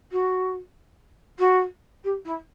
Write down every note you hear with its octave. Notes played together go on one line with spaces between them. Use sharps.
F#4
F#4
G4
E4